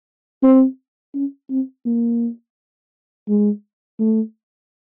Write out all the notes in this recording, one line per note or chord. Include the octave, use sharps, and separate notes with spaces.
C4
C#4
C4
A#3
G#3
A3